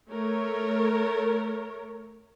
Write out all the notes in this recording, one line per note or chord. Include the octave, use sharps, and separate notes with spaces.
A3 A#4 C#5